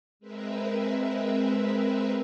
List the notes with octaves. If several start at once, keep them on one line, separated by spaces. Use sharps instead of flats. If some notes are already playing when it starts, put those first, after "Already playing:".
G#3 C4 A#4 B4 E5